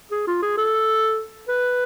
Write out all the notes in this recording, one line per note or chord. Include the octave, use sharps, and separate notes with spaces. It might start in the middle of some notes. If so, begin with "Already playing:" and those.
G#4
F4
G#4
A4
B4